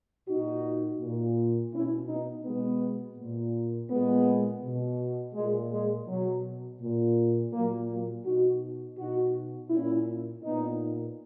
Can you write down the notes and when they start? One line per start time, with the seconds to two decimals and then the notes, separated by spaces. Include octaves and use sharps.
0.27 A#2 D#4 F#4
0.99 A#2
1.72 B2 C#4 E4
2.08 B3 D#4
2.45 B2 G#3 B3
3.18 A#2
3.89 A#2 G#3 B3
4.63 B2
5.35 A#2 G#3
5.71 G#3
6.08 B2 F#3
6.81 A#2
7.53 A#2 F#3 A#3
7.89 F#3 A#3
8.25 B2 D#4 F#4
8.98 B2 D#4 F#4
9.70 A#2 C#4 E4
10.43 A#2 B3 D#4